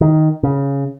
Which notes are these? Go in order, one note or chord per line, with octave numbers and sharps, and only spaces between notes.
D#3
C#3